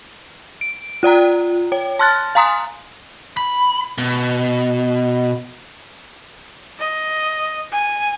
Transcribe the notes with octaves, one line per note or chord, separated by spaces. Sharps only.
D7
F4 D5 G5 A#5
C#5 G5
A5 C6 F6 F#6 A6
F5 G#5 A#5 C6 D#6
B5
B2
D#5
G#5